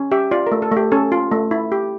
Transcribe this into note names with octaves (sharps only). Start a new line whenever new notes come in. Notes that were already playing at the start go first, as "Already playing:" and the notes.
Already playing: C#4
G4 E5
F4 D5
A#4
A3
A4
A3 G4
C#4 A4
F4
A3
E4
G4